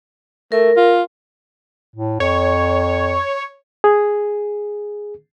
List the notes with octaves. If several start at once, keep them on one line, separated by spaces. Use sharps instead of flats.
A3 A#4
F4
A2
F2 C#5
G#4